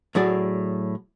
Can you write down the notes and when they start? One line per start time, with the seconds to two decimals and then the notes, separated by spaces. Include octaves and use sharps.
0.15 A2 F#3 G#4 D5